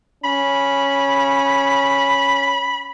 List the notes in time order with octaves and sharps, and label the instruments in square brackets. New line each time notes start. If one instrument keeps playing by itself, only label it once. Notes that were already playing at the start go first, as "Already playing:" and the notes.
[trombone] C#4 [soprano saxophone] B5